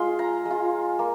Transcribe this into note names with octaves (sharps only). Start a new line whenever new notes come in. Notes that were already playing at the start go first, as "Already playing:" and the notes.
Already playing: G#3 F4 C6
A#5
G#3
F4
A#3